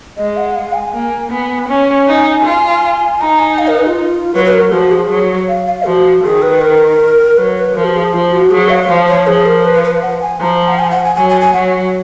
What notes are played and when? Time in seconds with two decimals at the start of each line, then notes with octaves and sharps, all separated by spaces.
0.17 G#3 D#5
0.37 F#5
0.55 F5
0.75 G#5
0.93 A#3
1.31 B3
1.69 C#4 G#5
2.07 D#4
2.45 F4
3.21 D#4 A#5
3.39 G#5
3.58 F5
3.68 A#4
3.77 B4
3.87 F4
4.35 F#3 B4
4.45 B4
4.53 A#4
4.72 F3 F#4
4.91 G#4
5.10 F#3
5.48 F5
5.66 F5
5.86 F3 F#4
6.23 D#3 G#4
6.42 B4
6.61 A#4
7.37 F#3 B4
7.57 B4
7.75 F3 A#4
7.84 F#4
7.94 G#4
8.13 F3 F4
8.32 F#4
8.51 F#3 G#4
8.69 F5
8.89 F3
9.08 C#5
9.27 F3 G#4
9.46 A#4
9.65 B4
9.84 B4
10.02 F#5
10.22 G#5
10.41 F3 A#5
10.68 F#5
10.79 G#5
10.91 F#5
11.04 G#5
11.16 F#3 G#5
11.29 G#5
11.41 G#5
11.53 F#3 F#5